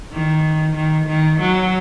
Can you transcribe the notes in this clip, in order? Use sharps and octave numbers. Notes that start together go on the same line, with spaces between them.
D#3
D#3
D#3
F#3